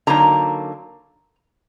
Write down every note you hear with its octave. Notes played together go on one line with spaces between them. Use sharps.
D3 F#3 A#3 D#4 A#5